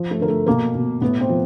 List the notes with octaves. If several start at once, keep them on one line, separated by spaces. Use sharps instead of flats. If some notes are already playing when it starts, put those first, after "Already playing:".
Already playing: F3
A3 A4
D3 A#4
A3 A4
B2 A#3 A#4
B2
A2 B3 B4
C4 C5
F3